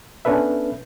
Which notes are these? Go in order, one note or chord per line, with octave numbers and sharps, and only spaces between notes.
B3 C#4 D4 A4 B4 E5